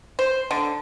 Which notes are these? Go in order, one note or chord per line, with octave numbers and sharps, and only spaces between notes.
C5
D3